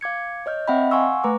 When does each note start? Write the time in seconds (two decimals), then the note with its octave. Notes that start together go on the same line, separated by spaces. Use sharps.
0.01 F5 D6 G#6 C#7
0.46 C#5 D#5 F6 G6
0.68 C4 D#5 E5 F#5 G5 B5
0.91 F5 F#5 G#5 C6 C#6 E6
1.24 A3 B4 A#5 C#6 D6